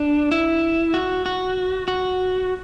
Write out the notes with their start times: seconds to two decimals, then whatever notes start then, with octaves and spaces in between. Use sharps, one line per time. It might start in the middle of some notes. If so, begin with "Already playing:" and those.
Already playing: D4
0.31 E4
0.94 F#4
1.26 F#4
1.88 F#4